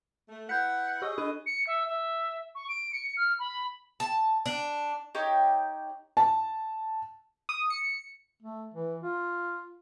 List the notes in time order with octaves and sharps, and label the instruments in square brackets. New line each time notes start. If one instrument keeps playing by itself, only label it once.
[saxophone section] A3
[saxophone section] E4 B4 F#5 [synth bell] G6 B6
[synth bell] G4 C#6 [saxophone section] G#4 D#5
[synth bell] D4 A4 D#7
[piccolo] C#7
E5
E5
C#6
D7
C#7
F6
B5
[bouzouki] A5
D4
[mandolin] D#4 G4 C#5
[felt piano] A5
[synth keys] D#6
C#7
[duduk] A3
E3
F4